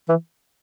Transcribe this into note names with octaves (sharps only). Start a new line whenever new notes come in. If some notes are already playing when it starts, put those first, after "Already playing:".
E3